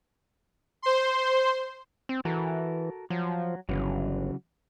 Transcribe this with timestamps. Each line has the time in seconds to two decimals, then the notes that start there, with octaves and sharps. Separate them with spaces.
0.82 C5 C6
2.09 C4
2.25 E3 F#4 A4 A#4
3.10 F3 F#3
3.69 G1 C#3 E3 F#3